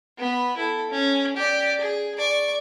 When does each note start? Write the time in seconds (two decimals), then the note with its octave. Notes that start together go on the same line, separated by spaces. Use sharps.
0.19 B3 B4
0.57 E4 A4
0.91 C#4
1.36 G4 D5
1.80 G#4
2.18 D5 C#6